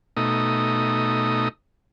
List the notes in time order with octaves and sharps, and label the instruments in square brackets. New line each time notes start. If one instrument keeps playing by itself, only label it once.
[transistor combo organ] B2 A3 D#4 D#6